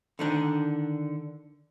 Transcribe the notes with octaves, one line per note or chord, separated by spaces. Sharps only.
D3 D#3 D4